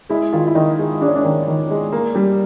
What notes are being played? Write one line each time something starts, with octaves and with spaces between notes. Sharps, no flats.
G#3 E4
D#3 F4
E4
D#3 D#4
G#3
G#3 D4
C#4
D4
D#3
D#3
G#3
A#3
G3